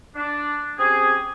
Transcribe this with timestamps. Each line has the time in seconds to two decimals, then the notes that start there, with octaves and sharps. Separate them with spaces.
0.15 D4
0.78 C4 C#4 G4 G#4